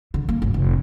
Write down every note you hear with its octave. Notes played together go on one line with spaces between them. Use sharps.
D3
A#3
G#1
F1